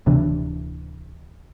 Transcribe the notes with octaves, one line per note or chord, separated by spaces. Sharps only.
D1 C3 E3 D4